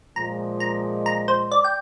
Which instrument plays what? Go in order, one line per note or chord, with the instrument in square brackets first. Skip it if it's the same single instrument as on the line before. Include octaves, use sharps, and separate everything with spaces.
[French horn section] A#2 F3 G#3 [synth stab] A#5
[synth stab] A#5
A#5
C5
D5
G5